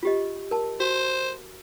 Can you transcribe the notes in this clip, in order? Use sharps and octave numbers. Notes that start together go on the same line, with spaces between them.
F4 G4 D#5
A#4 A5
F#4 C5